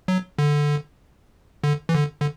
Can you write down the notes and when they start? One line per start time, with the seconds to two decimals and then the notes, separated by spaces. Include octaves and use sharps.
0.08 F#3
0.39 D3
1.64 D3
1.89 E3
1.95 D3
2.21 D3